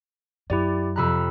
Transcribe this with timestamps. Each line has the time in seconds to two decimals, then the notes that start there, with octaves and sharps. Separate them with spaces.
0.50 F#2 E4 G4 D5
0.96 F2 C3 A#5 B5 E6 F#6